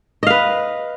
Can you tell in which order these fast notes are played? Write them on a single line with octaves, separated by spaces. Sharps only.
D#5 F5 B4